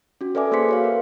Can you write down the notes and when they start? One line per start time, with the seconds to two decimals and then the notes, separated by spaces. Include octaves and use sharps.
0.21 C#4 F#4
0.35 A4 B4 D5 E5 G#5 D6
0.51 A#3 G#4 C5 C6 B6 C#7
0.69 F#4 C#5 F5
0.84 A#4